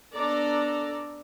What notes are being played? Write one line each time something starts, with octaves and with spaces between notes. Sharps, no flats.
B3 D4 A4 D5 A#5